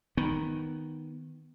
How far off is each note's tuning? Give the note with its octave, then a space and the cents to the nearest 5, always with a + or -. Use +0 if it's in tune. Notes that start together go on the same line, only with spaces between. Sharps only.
D#3 +0 B3 +0